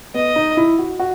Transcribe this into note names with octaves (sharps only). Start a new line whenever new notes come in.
B3 D#5
D#4
E4
F#4
F#4